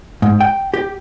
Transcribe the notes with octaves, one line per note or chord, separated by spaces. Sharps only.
G#2
G5
G4